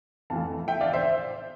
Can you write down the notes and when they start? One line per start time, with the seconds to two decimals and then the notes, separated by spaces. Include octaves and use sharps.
0.30 F2 E3 A3 F5 A5
0.68 E5 G5
0.81 D5 F5
0.93 C5 E5